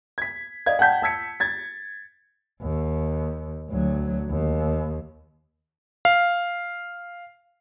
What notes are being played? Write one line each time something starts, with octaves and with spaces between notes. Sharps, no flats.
G#6 B6
D5 D#5 F5 G#6
F#5 G5 A5 G6 B6
A5 E6 G#6 B6 C#7
G#6 A6
D#2
D2 F#3
D#2
F5